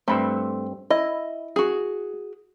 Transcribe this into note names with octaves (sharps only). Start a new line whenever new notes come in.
G2 A3 C4 B5
E4 D#5
F#4 G#4